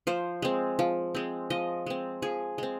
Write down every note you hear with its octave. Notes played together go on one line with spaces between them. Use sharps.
F3 C5
G#3 C4
F3
G#3 C4
F3 D#5
G#3 C4
F3 G#4
G#3 C4